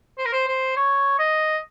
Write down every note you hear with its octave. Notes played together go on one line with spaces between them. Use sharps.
C5
A#4
C5
C5
C#5
D#5